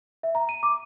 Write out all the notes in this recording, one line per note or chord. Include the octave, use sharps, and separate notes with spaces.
E5
A#5
D#7
D6